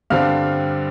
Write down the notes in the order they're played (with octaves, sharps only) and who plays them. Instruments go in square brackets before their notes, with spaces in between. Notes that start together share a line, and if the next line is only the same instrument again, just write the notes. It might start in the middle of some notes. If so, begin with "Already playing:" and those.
[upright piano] G2 D3 G3 C4 F5 F6